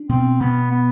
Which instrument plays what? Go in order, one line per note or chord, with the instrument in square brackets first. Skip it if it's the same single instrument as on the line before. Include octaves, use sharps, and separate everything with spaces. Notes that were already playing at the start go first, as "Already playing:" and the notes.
Already playing: [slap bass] D4
[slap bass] B2 [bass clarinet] C4
[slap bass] B2 [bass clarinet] B3
[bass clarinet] B3